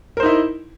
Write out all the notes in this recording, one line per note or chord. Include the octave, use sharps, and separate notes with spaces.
D#4 E4 A#4 C5